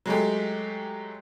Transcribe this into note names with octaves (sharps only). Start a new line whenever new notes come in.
F#3 G#3 A3 G4